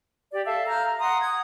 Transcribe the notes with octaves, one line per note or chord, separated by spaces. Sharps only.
G4 D5
A4 E5 F5 A5
F5 A#5 F6 G6
A#5
F#5 A#5 C6 D#6
F#5 D#6 G#6